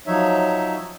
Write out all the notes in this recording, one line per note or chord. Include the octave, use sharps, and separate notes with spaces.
F3 F#3 D#4 C#5 E5